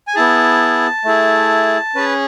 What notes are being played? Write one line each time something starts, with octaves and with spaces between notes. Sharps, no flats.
G#5
B3 E4 G#4 A5
A3 E4 G#4
C#4 G#4 B4